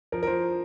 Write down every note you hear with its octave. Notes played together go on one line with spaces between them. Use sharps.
F3 A#4
A#4
F3 C5